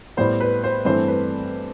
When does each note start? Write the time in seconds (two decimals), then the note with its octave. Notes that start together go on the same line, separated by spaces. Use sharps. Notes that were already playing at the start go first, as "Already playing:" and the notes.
0.17 A2 G3 B3 C5
0.40 B4
0.64 C5
0.85 G2 E3 A3 C4 C5
1.08 B4